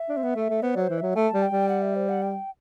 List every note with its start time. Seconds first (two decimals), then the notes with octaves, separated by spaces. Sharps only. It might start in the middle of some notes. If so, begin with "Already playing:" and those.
Already playing: E5
0.09 D4
0.17 C4
0.23 B3
0.36 A3
0.50 A3
0.63 B3 C5
0.75 F#3 D5
0.81 C5
0.89 E3
0.98 F#3 E5
1.16 A3 A5
1.34 G3
1.42 G5
1.51 G3
1.69 F#5
1.82 E5
1.96 C5
2.09 F#5
2.22 G5